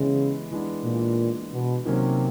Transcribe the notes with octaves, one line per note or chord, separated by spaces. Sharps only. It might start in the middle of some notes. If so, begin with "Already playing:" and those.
Already playing: C#3 E3 G#3 B3 E4 G4
E3 G#3 B3 D4
A#2
B2
C3 D#3 F#3 A#3 C#4